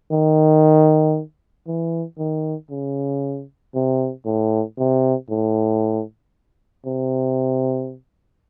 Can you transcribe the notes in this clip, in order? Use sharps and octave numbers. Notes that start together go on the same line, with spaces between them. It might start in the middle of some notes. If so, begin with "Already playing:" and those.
D#3
E3
D#3
C#3
C3
A2
C3
A2
C3